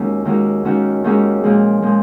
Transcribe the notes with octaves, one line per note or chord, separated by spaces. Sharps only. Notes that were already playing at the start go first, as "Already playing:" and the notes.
Already playing: D#2 G#3 C#4 F#4
D#2 D#3 G#3 C#4 F#4
D#2 D#3 G#3 C#4 F#4
D#2 D#3 G#3 C#4 F#4
A#2 F3 G#3
A#2 F3 G#3